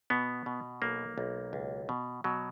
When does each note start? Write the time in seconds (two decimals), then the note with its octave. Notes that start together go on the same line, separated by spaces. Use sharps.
0.10 B2 B3
0.46 B2
0.82 B1 A#3
1.18 B1
1.53 C#2
1.89 B2
2.24 B2 F#3